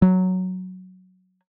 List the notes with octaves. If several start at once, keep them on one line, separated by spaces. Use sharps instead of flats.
F#3